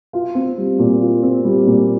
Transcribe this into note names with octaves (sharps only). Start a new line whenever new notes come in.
F4
C4
G3
A#2
F4
C4
G3
A#2